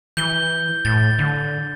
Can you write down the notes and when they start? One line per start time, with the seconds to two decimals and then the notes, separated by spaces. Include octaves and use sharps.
0.17 E3 G6 G7
0.85 A2 A6
1.19 D3